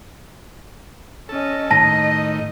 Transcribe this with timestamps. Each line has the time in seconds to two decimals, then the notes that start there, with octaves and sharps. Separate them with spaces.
1.29 C#4 A4 D#5
1.71 A2 D#3 D#5 A5 A#6